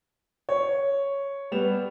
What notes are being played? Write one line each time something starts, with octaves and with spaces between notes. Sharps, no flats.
C#5
G3 B3 E7 F7